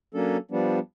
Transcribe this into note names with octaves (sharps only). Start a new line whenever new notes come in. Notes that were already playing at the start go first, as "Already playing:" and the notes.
F#3 A#3 C#4 D4 A4
F3 G3 B3 D4